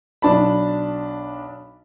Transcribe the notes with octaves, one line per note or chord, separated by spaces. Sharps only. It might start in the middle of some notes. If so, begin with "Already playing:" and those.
B1 D4 A5 B5